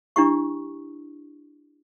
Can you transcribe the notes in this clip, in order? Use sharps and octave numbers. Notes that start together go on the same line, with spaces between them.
D4 E4 G4 C#6